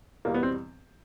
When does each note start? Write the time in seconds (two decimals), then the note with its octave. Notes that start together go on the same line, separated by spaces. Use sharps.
0.25 E2 B2 G3 A#3
0.34 B3
0.43 C4